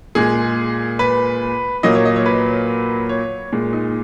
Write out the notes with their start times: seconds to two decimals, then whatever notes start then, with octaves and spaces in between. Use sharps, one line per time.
0.15 A#2 G#3 G#4
0.99 B4
1.83 A#2 F#3 A#3 D#5
1.95 C#5
2.05 D#5
2.16 C#5
2.26 B4
3.09 C#5
3.53 A#2 G#3
3.73 D#4